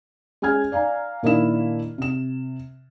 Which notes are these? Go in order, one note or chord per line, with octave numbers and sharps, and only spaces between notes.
G#3 C#4 G#5 F6 G#6
D5 F5 G#5 A#5
A#2 D#3 A#3 D4 E4 E7
C3 E7